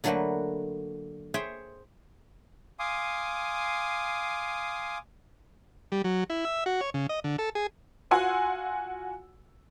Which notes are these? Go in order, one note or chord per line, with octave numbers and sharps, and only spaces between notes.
D3 F#3 A3 A#3 F#4 B4
G#4 C5 C#5 E5 G5
F5 G#5 C6 D6 D#6
G3
F#3
E4
E5
F#4
C#5
C#3
D#5
D3
A4
G#4
F4 F#4 F#5 G#5 C6 E6